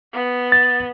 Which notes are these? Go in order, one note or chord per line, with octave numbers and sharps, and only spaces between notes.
B3
A6